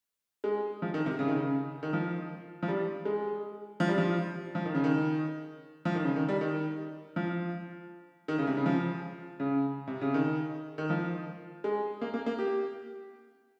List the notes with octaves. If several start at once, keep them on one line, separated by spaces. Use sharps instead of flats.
G#3
F3
D#3
C3
C#3
D#3
C#3
D#3
F3
F3
G3
G#3
F3
G3
F3
F3
D#3
C#3
D#3
F3
D#3
C#3
D#3
G3
D#3
F3
D#3
C#3
C3
C#3
F3
C#3
C3
C#3
D#3
D#3
F3
G#3
A#3
A#3
A#3
G4